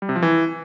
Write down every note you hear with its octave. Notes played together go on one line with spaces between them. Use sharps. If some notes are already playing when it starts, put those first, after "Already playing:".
G3
C3
F3
E3